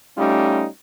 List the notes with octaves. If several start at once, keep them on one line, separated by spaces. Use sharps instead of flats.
G3 A3 C#4 D#4 F4 G4